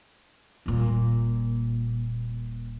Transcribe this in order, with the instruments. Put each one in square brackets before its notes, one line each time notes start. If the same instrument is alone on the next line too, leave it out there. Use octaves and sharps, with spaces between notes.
[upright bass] D#1 A#2